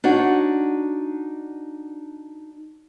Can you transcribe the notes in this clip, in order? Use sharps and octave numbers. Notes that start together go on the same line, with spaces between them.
D4 D#4 F#4 C#5 F#5